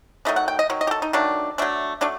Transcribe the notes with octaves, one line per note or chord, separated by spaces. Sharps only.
D#3 F#3 A3 D4 D#5
F#5
G5
D#5
D#3 F#3
D#5
G4
A4
D#4
D#3 F#3 A3 D4
F#3 A3 D4
F#3 A3 D4